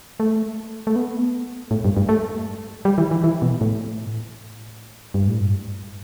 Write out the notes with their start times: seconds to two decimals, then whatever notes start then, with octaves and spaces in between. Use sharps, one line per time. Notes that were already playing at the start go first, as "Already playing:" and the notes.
0.20 A3
0.87 A3
0.96 B3
1.71 A2
1.85 G2
1.97 G2
2.09 A3
2.85 G3
2.98 E3
3.11 E3
3.24 E3
3.42 B2
3.61 A2
5.14 G2
5.28 A2
5.41 G2